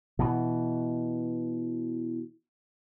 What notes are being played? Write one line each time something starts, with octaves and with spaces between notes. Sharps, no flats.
B2 E3